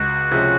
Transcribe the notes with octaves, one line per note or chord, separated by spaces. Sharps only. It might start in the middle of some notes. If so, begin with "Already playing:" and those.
Already playing: C#2 F#4
C3 F3 G#3 C#4